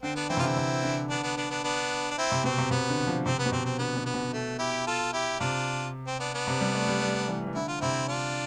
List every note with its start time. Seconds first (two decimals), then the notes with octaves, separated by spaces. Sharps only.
0.03 D3 C4
0.16 B3 D4
0.29 E3 C4 E4
0.37 C3 F4
0.43 D3 C4 E4
0.57 C3
0.83 D3
1.10 B3 D4
1.23 B3 D4
1.37 B3 D4
1.50 B3 D4
1.64 B3 D4
2.11 D4
2.18 C4 E4
2.32 C3
2.44 B2 C4
2.58 C3
2.71 C3 B3
2.89 D3
3.07 F3
3.26 C3 C4
3.39 B3
3.46 B2
3.52 C3 C4
3.65 C4
3.78 D3 B3
3.97 B2
4.06 B3
4.14 B2
4.33 A3
4.59 E4 G4
4.87 F4 A4
5.13 E4 G4
5.40 C3 D4 F4
6.07 C4
6.20 B3 D4
6.34 B3 D4
6.47 C3
6.61 G3
6.74 A3
6.88 G3
7.01 G3
7.28 E3
7.47 E3
7.55 D3 E4
7.68 F4
7.81 C3 C4 E4
8.08 D4 F4